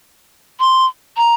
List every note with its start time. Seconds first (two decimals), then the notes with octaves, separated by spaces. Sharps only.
0.60 C6
1.17 A#5